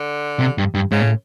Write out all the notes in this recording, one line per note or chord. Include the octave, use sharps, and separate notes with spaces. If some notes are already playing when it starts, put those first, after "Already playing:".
Already playing: D3
C3
G2
G2
G#2 C#3
A2